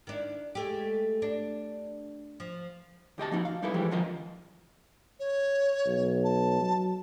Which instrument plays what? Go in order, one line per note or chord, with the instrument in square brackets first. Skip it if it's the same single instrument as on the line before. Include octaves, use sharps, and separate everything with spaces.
[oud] D#3 D4 E4
G#3 A3 G4
D4
F3
[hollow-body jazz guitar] D2 G4 D#5 A5
F3 A#3 D#4 F#4
F5
G3 D#4 E4 A4 B4
E3 F3 G3 G#3 G4
D3 D#3 F3 A#3 F4 D#5
[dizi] C#5
[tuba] B1
[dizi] A5
[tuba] F#3